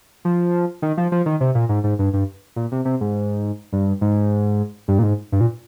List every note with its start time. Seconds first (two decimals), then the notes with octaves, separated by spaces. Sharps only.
0.25 F3
0.82 D#3
0.97 F3
1.12 F3
1.26 D#3
1.41 C3
1.55 A#2
1.69 G#2
1.84 G#2
1.99 G2
2.13 G2
2.56 A#2
2.72 C3
2.85 C3
3.01 G#2
3.73 G2
4.01 G#2
4.88 G2
4.99 A#2
5.03 G#2
5.32 G2
5.41 A#2